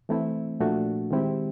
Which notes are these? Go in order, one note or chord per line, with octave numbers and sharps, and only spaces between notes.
E3 A3 C4 E4
A#2 F3 A3 D4 F#4
D#3 G#3 C4 E4 G4